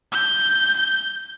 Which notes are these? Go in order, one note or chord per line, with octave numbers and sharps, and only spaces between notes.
G6